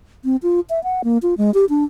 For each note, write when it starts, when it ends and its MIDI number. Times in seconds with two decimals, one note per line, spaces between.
0.25 0.36 60
0.43 0.60 65
0.70 0.82 76
0.84 1.02 78
1.04 1.18 58
1.22 1.34 65
1.38 1.53 56
1.54 1.65 67
1.69 1.84 62